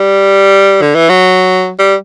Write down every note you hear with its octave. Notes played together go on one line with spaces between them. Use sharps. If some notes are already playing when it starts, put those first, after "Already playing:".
Already playing: G3
D3
E3
F#3
G3